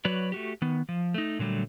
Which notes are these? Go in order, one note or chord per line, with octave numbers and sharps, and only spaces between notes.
F#3 F#4 B4 C#5 D5
A3 F#4 G4
D#3 B3
F3
A3 D#4
A#2 D3 F#3 G3 A3